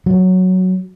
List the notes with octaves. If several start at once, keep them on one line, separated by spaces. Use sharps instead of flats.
F#3